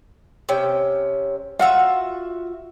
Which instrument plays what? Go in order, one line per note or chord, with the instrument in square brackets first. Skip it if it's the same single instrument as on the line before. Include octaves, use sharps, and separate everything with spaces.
[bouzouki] C3 C#4 G5
[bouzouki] F4 F#4 E5 [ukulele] F#5